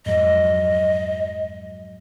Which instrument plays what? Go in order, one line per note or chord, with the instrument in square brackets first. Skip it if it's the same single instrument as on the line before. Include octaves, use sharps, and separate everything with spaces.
[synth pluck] F2 G#2 F#3 [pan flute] D#5